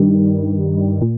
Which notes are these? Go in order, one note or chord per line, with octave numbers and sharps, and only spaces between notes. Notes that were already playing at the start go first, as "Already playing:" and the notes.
Already playing: G2 D#3 G3
A#2